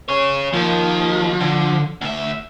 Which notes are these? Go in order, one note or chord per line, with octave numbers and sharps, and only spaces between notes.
G#4 C#5
D#2 D#3 F3
D3
D2 E5